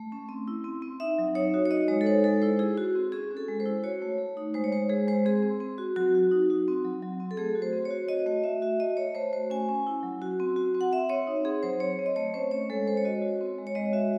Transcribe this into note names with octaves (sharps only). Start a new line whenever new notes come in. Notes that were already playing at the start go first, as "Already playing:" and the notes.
Already playing: A3
C#4
C4
E4
C4
C4
D#4 E5
F#3
D#4 C#5
F#4
C#5
D#4 D#5
G#3 C#5
A4
D#4 C5
G#3 A4
E4 C5
E4 G#4
E4 F#4
C4
C#4 G#4
C#4
A4
G#3
C5
E4
F#4 C#5
A3
A3
D#4
G#3 C5
C#5
G#3 C5
G#3 G#4
G#3 C5
C4 G#4
C4
C4
F#4
F#3 F#4
F#4
D#4
F#4
C4
F#3
F#3
C4
A4
A3 G#4
F#4
C5
C4
C#5
F#4
F#4 D#5
A3 D#5
F#4 E5
F#4 E5
A3 D#5
A3 C#5
A3 C5
F#4 C5
C#4 G#5
C#4
E4
F#3
F#4
C4
F#4
C4
F#5
C4 E5
C4 C#5
D#4
C4 G#4
F#3 C5
C4 C#5
C4
D#5
A3 C#5
C#4 C5
C#4 C#5
G#3 A4
G#3 C5
C#5
F#4 D#5
F#4
C4
G#3
C#5
G#3 D#5
F#4 E5